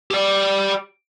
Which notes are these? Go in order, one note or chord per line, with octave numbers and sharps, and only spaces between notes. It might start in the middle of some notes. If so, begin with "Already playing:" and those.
G4 D5